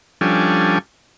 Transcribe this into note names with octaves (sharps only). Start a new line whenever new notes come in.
F3 G3 C#4 D4 A4 G#5